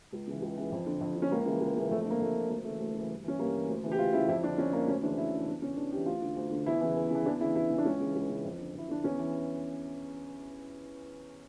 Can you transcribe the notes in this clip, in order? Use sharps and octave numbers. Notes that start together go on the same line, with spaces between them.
C#2
C#3 E3
C#2
C#3 E3
F2
D3
F2
D3
C#4
C#2 A#3
C#3 E3
C#2
C#3 E3
F2 A3
A3
D3
A#3
F2 A3
D3
D2 A#3
C#3 E3 A3
D2
C#3 E3
G2
E3 C#4
G2 A#3
E3
D2
C#3 E3
G4
D2 F4
C#3 E3 E4
F2 E4
D3 D4
F2 C#4
D3 A#3
D2 C#4
C#3 E3 D4
D2 E4
C#3 E3
E2 D4
C#3 E3 C#4
E2 D4
C#3 E3 G4
D2 F4
D3
D2
D3
E2 E4
C#3 E3
E2
C#3 E3
E2 D4
C#3 E3 E4
E2 E4
C#3 E3
D4
C#2 C#4
C#3 E3
C#2
C#3 E3
F2
D3
F2 E4
D3 D4
E2 C#4
E3